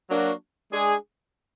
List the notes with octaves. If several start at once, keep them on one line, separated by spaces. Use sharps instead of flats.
F#3 A#3 D4 F#4
G#3 D4 G#4